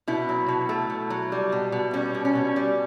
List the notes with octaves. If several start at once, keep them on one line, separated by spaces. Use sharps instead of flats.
B2 E4
F#3
B2
A3
B2
F#3
G3
B2
B2
G3 C#4
B2
C#4
B2
G3